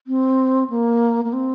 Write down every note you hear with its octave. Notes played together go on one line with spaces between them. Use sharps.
C4
A#3
A#3
C4